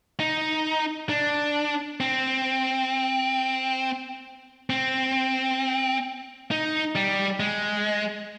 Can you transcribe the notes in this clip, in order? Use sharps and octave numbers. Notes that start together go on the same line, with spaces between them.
D#4
D4
C4
C4
D#4
G3
G#3